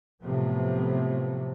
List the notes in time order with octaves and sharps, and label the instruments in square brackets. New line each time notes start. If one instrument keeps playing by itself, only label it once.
[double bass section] F2 A2 C3 F3 F#3 B3